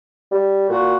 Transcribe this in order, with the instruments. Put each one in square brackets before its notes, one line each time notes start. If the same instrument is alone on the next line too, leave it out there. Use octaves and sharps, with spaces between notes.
[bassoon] G3
[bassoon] A#2 [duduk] F#4